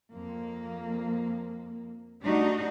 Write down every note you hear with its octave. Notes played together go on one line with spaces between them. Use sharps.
F2 A#3
G3 A3 D4 D#4 F#4